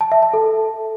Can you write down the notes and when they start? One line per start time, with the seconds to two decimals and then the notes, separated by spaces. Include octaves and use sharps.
0.01 A5
0.12 E5
0.23 A5
0.34 A4